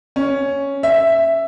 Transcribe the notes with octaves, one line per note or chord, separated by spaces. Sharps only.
C#4
E5